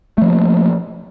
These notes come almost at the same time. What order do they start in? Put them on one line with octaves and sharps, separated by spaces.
A3 F3 A#3